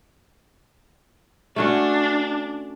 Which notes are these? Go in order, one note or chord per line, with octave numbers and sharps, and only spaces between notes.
A3 C#4 D4 F#4